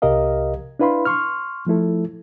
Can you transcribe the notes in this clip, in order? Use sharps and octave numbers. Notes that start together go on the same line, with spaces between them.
C2 C3 G4 A#4 D#5 F5
D4 E4 B4 F5 B5 C6
C6 C#6 F6
F3 A3 E4 A4